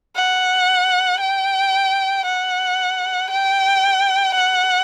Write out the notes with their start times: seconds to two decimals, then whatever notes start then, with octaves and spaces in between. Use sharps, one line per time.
0.16 F#5
1.20 G5
2.25 F#5
3.30 G5
4.35 F#5